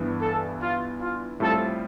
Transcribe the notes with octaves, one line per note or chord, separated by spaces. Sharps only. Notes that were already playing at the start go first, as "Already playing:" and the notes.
Already playing: G2 E3 B3 D4
A4
F4
F4
A2 G3 C4 F4 A4